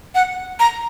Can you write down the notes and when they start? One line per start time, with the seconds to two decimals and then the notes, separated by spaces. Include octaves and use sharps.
0.15 F#5
0.60 A#5